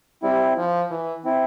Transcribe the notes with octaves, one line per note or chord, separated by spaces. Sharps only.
G3 C4 E4
F3
E3
C4 E4